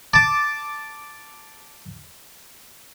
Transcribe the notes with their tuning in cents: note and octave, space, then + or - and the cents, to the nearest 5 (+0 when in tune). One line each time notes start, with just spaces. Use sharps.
A5 +0 D6 +0